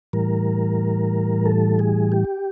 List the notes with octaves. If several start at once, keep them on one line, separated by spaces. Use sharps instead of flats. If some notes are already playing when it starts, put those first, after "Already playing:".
A2 E3 G3 A#4
A4
G#4
G4